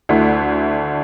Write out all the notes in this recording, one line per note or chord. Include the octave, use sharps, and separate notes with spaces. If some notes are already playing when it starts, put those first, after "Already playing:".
D2 D3 A3 E4